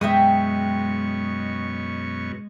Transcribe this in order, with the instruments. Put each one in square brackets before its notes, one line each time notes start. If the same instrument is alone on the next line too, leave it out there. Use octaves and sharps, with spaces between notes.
[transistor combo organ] F#2 B2 C#6 [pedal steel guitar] G#3 [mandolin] E5 G5 D#6